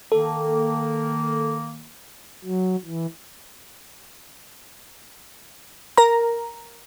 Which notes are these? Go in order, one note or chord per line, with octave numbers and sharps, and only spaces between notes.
D#3 A#3 A4
F#3
E3
A#4 A#5